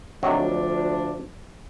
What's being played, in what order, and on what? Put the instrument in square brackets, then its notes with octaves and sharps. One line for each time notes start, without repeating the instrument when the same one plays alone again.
[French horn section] D2 F3 [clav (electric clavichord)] C3 D#3 F#3 [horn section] D4